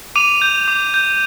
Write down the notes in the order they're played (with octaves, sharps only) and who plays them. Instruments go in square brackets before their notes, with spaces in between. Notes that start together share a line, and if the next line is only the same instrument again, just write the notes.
[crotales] D6 D#7 F7
G6
D6
G6